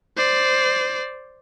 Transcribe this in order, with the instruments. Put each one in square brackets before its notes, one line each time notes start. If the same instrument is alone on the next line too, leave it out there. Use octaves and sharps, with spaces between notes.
[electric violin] C5 D5